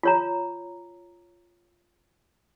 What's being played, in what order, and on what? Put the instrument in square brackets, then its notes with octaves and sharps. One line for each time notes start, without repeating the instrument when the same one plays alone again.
[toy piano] F4 C#5 A#5